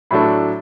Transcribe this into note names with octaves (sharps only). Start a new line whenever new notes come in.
A2 F#3 D4 A4